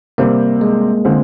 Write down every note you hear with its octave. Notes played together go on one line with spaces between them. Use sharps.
C3 G3 A#3 C4
G#3
D3 G#3 C4 F4